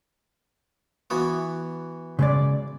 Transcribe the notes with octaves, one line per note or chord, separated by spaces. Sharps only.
E3 B3 F#4
C#3 G#3 D5